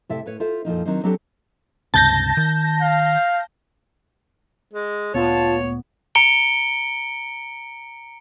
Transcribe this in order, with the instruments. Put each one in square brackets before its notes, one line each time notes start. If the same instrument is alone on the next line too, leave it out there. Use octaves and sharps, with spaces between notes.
[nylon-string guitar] A2 C3 A4 D5 E5
A2 B4 C#5
F4 A4 C5 E5
F2 A#2 F3 D#4
D#3 F#3 C4 D4 D#4 C5
F#3 C4 D4 G4 A4 D5
[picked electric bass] C#2 G2 C3 [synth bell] A5 G6 A#6
[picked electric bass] D#3
[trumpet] F5
[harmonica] G#3
[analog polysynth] D2 A#2 B3 [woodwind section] F4 A5 [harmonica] C#5
[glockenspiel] A#5 C#7 D7 G7